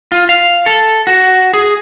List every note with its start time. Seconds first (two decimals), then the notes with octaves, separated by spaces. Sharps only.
0.12 F4
0.29 F5
0.66 A4
1.07 F#4
1.53 G#4